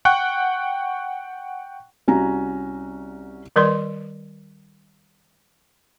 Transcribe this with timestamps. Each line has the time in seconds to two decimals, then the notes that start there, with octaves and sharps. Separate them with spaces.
0.05 F#5 G5 C#6 F#6
2.08 C2 C#4 F#4 A#5
3.56 D#3 G3 A#4 B4 D5 C6